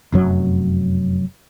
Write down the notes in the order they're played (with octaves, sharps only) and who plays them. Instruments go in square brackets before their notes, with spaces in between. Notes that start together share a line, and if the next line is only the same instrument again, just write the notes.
[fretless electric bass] F1 F#2 F#3